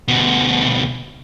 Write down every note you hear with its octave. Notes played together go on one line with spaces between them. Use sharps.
D2 B2